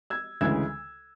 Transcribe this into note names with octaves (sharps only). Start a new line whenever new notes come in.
E6 G#6
D2 C#3 E3 G#3 E6 G#6